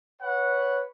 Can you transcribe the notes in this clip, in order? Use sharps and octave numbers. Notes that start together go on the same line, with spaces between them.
B4 C#5 F#5